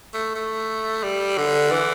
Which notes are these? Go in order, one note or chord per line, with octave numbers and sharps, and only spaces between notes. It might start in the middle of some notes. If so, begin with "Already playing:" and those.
A3
A3
G3
D3
E3